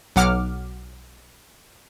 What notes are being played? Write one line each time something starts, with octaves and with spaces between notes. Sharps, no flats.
B1 F#3 F#5 D6 F6